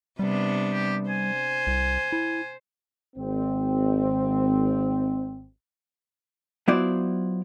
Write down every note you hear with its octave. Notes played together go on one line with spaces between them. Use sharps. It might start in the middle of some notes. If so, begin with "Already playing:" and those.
C3 G3 B3 D4
G4
C5 G#5
C2
E4
G#1 C4
F#3 B3 E4 F4 C5 D5